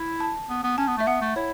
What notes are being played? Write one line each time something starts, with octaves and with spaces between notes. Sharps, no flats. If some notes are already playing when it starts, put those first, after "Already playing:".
Already playing: E4
A5
B3
B3
C#4 A5
B3
A3
E5
B3 F#5
A3
E4 C#5